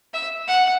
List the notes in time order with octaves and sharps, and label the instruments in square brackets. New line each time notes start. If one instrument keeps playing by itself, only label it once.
[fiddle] E5
F#5